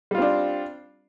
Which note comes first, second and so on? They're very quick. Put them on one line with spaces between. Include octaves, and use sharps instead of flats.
G3 F4 C4 D4